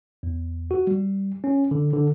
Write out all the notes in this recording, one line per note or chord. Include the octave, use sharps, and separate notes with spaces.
E2
F#4
G3
C#4
D3
D3